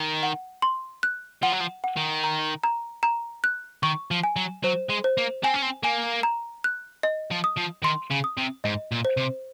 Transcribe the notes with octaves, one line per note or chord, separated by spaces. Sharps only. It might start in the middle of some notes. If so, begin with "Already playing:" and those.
Already playing: D#3
F#5
C6
F#6
F3 F#5
F#3
F3
F#5
D#3
A#5
A#5
A#5
F#6
D#3 C#6
F3
G#5
F#3
F#3 C5
G#3
C5
A#3
C4 G#5
C#4
C4
A#3 G#5
A#5
F#6
D#5
F3
D#6
F3
D#3 C6
C#3
D#6
C3
G#2 D#5
A#2
C5
C3